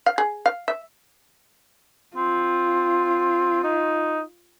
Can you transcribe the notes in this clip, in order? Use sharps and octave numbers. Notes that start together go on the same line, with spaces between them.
F5
G#4
F5
E5
C4 F4
D#4